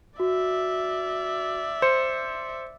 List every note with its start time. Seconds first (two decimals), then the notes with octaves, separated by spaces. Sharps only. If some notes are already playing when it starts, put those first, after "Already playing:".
0.20 F#4 D5 E5
1.82 C5 C#7